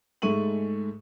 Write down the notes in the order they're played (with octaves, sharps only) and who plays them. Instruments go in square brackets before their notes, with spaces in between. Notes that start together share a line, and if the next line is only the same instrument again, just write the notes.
[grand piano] G#2 G#3 A3 C#6 D#7 F#7